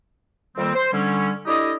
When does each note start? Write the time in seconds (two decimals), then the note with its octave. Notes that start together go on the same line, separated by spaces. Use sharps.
0.56 F2 D#3 G3 A#3 C4
0.74 C5
0.93 D3 G3 C#4
1.46 D4 E4 G4 A4 D#5